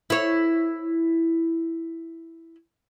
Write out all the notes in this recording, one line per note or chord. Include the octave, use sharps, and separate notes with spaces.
E4 C#5